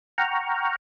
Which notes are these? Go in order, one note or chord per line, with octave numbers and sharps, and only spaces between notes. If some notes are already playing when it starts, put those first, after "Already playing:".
F#5 G5 A#5 C#6 F6